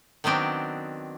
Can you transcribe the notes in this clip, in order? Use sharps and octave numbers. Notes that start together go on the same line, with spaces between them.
D#3 F#3 B3 C4 D4